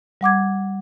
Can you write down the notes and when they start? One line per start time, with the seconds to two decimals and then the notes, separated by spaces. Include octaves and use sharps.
0.21 G3 F#5 D6 G#6